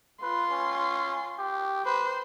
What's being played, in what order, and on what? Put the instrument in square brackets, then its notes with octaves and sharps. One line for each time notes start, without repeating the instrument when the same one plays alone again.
[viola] F4 C6 [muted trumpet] B4
[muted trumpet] C#4
G4
[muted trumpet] B4 [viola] C5